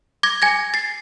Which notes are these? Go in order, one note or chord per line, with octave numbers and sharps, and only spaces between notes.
D6 G#6 A#6
G#5 G#6 A#6
A6 C7